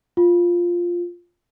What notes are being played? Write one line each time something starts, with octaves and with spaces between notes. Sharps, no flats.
F4